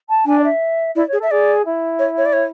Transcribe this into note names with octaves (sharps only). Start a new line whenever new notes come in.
A5
D4 G#5
D5
E5
E4 D5
C#5
G#4
A4 E5
G#4 D5
E4
C#5
C#5
D5
C#5